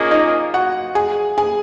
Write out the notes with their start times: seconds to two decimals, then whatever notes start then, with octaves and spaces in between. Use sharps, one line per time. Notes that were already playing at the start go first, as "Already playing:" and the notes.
Already playing: A#3 C#4 F4 G#4 D#5 F5
0.11 D#4 D#5
0.54 F#4 F#5
0.95 G#4 G#5
1.38 G#4 G#5